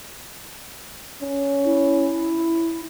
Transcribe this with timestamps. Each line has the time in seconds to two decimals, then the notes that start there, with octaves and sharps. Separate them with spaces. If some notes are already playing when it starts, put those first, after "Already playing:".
1.22 C#4
1.65 E4